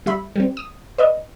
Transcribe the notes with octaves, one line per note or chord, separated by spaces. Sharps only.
G3 E5 B5
G3 C4
D#6
B4 D5 D#5